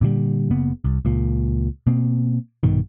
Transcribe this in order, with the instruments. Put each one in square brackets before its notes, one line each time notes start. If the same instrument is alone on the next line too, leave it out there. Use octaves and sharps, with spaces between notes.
[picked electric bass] A#2 D3 F3 G3
F#1 C#3 A#3 B3
C2
C#2 A#2
B2 A#3 C4
A#1 G2 B2 D#3